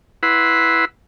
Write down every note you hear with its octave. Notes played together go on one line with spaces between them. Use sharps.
E4 B4 F#5 B5 C6